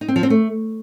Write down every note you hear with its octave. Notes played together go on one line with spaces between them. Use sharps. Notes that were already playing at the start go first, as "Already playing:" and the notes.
D#4
C4
F3
C4
A3